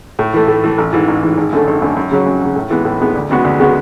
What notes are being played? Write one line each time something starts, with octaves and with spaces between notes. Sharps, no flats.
A2
E3 A3
A2
E3 A3
A1
G#2 E3
A1
G#2 E3
G#1
F#2 D3 A3
G#1
F#2 D3 A3
F#2
C#3 F#3
F#2
C#3 F#3
A2
E3 G#3 B3
A2
E3 G#3 B3
D2
C#3 G#3 B3 F#4
D2
C#3 G#3 B3 F#4